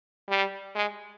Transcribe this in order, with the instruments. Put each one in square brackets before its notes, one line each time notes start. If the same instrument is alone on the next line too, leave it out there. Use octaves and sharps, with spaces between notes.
[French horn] G3
G#3